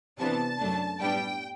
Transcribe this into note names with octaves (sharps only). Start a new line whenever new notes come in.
C3 E3 B3 D4 A5
F#2 F#3 A3 D4
A2 G3 B3 D4 G5